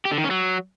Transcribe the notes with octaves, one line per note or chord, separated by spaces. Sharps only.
G4
D3
D#3
C#4
F#3